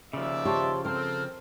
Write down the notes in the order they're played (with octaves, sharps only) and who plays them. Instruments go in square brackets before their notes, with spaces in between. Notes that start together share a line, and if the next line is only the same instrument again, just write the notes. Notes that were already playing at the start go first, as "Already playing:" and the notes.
[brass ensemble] D#2 D5 E5 [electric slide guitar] C#3 F3
[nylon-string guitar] F4 G4 C#5 [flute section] C5 A5 C6
[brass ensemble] C4 [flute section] A4 F6 [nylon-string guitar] A#4 C5